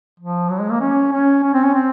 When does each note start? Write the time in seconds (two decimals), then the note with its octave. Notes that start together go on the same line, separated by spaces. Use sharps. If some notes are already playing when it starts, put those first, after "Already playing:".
0.20 F3
0.50 F#3
0.60 G#3
0.71 A#3
0.81 C#4
1.12 C#4
1.43 C#4
1.54 C4
1.64 C#4
1.75 C4